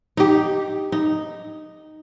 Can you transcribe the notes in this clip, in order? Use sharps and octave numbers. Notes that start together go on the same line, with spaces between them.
D#4 G4
D#4